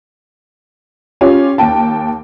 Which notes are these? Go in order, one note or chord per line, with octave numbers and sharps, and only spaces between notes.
C#4 F4 G4
D#2 G5 A5